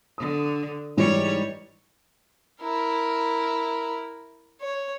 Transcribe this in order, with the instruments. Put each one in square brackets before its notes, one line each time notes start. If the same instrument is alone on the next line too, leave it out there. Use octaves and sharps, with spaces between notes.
[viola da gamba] D3 [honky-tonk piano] D#6
[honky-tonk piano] G#2 E3 [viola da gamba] G3 C#5
[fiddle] E4 A#4
C#5